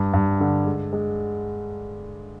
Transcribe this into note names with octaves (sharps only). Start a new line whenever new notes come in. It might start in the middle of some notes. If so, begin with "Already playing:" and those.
Already playing: G2
G2
D3
G#3
G#3